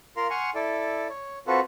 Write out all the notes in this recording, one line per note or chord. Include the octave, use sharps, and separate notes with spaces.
F4 A#4 F5 A#5 C6
F#5 G#5 C6 C#6 F6
E4 A4 D5
C#5
C4 F4 F#4 A4 B4